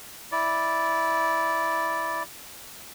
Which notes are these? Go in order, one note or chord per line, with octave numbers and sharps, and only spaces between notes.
E4 D5